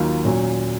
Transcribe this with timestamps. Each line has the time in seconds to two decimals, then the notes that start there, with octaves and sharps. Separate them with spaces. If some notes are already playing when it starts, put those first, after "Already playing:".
Already playing: D#2 D#3 F#3 A#3 F4
0.25 A#2 F#3 C#4